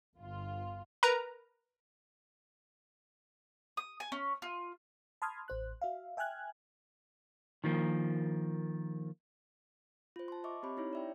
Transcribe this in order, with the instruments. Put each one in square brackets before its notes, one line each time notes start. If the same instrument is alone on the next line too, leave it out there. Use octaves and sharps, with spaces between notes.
[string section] G1 F4
[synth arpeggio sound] A#4 B4 A#5
[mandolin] D#6
G#5
C#4
F4
[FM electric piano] A5 B5 C6 D#6 F6 G#6
A1 C5 F#6
F#4 E5 F5
E5 G5 G#5 F6 F#6 G#6
[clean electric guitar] D#3 F3 A#3
[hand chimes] F4 C5
A5 C6
D#5 E5 C#6 D6
C4 G4 C#5 B5
D#4 E4 C#5
D5 E5 G5